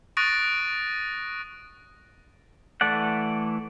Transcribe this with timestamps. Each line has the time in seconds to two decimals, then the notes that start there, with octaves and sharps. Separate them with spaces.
0.17 C#6 D#6 F#6 A6 A#6 D7
2.81 E3 A3 A4 D5 F#5